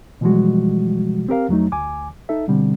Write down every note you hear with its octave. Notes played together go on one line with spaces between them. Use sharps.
B2 E3 F3 G3 G#3 F#4
C4 G4 A#4 F5
F2 F#3 A3 D#4
D2 G#5 D6
D#4 A4 E5
B2 D3 G3 C4